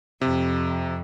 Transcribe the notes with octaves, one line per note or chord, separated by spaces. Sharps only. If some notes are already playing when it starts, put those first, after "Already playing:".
F2 C3